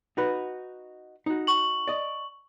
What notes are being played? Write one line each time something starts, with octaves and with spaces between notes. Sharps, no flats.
D#4 F#4 B4
D#4 F#4
C#6 F#7
D5 D#5